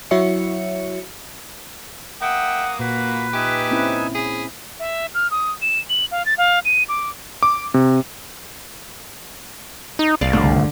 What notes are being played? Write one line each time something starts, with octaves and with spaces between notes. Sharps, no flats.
F#3 E4 F#4 C#5 E5 C#7
A#3 E5 F#5 G5 D#6
A#2 F#4 B4
D#4 G4 E5 G#5
C4 C#4 E4
G#4 B5
E5
F6
D#6
E7
F#7
F5
A6
F5
D#7
D6
D6
C3
D#4
C2 D5 F5
G1 C#2 D3 A3